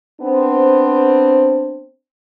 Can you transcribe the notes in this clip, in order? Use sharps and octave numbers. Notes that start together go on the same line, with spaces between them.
B3 C4 D4 C5